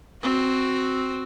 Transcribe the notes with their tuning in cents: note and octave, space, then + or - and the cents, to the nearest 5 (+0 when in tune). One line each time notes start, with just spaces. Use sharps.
C4 +0 F#4 +0